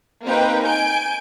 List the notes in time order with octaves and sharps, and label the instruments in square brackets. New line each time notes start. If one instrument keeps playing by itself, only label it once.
[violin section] A#3 C4 D#4 G4 B4 G5
G#5 G6 D7